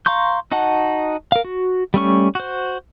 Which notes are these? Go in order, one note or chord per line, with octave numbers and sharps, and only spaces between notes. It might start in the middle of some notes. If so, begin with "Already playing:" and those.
F5 A#5 C6 C#6 G6
D#4 F#4 D#5 F#5 A5
A#4 F5
F#4
G3 A3 C#4 C#6
F#4 C5